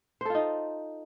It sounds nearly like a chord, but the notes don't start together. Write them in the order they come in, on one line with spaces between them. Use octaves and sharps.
C5 A4 F4 D#4